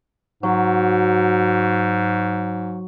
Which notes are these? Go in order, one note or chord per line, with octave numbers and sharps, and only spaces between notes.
G#2 F#3